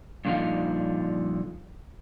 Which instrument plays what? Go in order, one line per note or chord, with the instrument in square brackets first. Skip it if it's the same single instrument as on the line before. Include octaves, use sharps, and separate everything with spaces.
[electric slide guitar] G2 A#2 D3 F3 D#4 F5